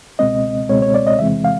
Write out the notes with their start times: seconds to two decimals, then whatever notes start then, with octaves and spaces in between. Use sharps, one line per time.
0.19 C#2 B2 G#3 C4 D#5
0.69 C#2 B2 G#3 C4 C#5
0.82 C#5
0.94 D5
1.07 D#5
1.19 E2 C3 E3 G#3 C4 E5
1.44 F5